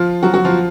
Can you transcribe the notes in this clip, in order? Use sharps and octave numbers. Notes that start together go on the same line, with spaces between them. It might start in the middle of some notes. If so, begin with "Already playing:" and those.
Already playing: F3 F4
F#3 F#4
F#3 F#4
F3 F4